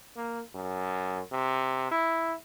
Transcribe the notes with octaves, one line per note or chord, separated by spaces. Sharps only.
A#3
F#2
C3
E4